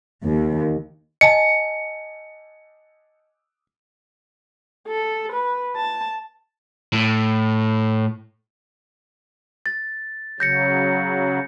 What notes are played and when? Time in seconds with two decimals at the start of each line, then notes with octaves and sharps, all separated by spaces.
0.24 D#2
1.21 D#5 G#5 A5 C#7
4.88 A4
5.32 B4
5.76 A5
6.93 A2
9.66 A6
10.40 C#3 F#3 G6 A#6 C#7